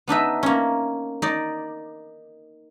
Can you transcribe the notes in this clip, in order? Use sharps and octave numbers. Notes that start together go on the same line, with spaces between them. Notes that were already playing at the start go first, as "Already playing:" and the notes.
B3 D4 D#4 E5
A#3 C#4
D#4 D5